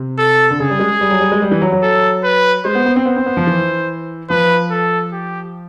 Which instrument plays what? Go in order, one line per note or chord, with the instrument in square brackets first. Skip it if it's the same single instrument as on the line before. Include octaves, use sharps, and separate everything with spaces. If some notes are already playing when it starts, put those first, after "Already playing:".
Already playing: [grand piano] C3
[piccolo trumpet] A4
[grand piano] D3
[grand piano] C#3 [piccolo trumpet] G#4
[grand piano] G3
G#3
G3
F#3
G3
G#3
G3
E3
F#3
F#3
[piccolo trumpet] A4
B4
[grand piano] G#3 [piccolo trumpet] C5
[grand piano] B3
B3
C4
[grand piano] B3 [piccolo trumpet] C5
[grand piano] C4
B3
F3
E3
[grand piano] F3 [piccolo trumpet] B4
[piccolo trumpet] A4
G4